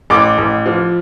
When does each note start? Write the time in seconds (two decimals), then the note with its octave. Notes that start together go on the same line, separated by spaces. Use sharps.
0.10 A1 D6
0.38 A1
0.66 F3